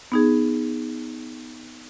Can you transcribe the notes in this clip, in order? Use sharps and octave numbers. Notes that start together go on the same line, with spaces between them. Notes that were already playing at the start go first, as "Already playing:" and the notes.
B3 D#4 G#4